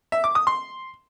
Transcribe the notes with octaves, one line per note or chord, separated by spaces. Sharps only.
E5
D6
D#6
C6